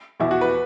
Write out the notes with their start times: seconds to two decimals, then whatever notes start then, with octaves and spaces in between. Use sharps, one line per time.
0.20 E2 B2 E4
0.31 F#4
0.41 B4